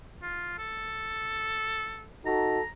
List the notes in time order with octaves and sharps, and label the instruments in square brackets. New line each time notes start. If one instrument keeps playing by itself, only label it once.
[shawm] F4
A4
[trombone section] D#4 F#4 A4 [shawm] A#5